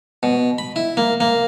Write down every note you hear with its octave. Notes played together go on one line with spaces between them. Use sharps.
B2
B5
E4
A#3
A#3